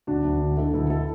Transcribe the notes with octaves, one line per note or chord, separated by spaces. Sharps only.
D2 D4 F#4
D2
D3
D3 E4 A4
D2 E4 A4
E4 A4